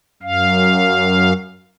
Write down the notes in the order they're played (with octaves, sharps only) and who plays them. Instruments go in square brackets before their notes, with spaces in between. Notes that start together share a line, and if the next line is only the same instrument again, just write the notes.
[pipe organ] F#2 F5